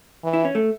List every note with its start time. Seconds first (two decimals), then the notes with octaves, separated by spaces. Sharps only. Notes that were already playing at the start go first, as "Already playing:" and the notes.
0.24 E3
0.33 E4
0.45 C#4
0.55 A3